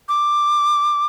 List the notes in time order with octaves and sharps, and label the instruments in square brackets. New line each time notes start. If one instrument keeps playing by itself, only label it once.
[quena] D6